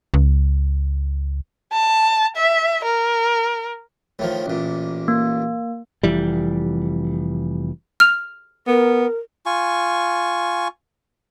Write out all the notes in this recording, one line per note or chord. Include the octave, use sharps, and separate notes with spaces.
C#2
A5
E5
A#4
A2 D#3 F3
A1 A#2
A#3
F1 E3 G3
F6 F7
B3 A#4
F4 G#5 C#6